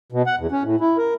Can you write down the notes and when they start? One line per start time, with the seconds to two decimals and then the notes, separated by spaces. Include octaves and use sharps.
0.12 B2
0.26 F#5
0.39 E2
0.52 C#4
0.63 A2
0.80 E4
0.98 A#4